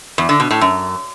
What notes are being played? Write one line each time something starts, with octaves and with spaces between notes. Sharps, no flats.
E2
D3
B2
A2
F#2